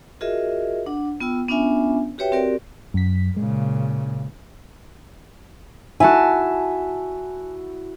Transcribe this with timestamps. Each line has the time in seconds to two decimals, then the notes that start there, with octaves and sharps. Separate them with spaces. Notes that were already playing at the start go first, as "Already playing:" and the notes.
0.21 F4 F#4 G#4 A#4 D#5 E5
0.86 D4 F#5
1.20 B3 F4 G5 E6
1.48 B3 C#4 D4 F4 E5 G#5
2.18 F#4 G4 B4 C#5 E5 G5
2.32 C4 F#4 G4 A#4 D5
2.94 F#2 B6
3.37 A#2 C#3 G#3
6.00 E4 F#4 G#5 A5